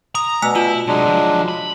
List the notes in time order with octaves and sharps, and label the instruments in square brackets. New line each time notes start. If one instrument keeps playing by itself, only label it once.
[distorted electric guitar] A#5 [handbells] D#6
[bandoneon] B2 [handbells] A3 G#5 E6
[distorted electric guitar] E4 [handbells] F4
[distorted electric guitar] C3 D#4 [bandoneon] F#3 G#3 D4
[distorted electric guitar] D3 F3
B5